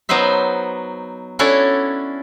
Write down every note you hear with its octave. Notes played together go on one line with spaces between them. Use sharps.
F#3 B3 D#4 C5 E5
C#4 D4 E4 F#4 A4 C#5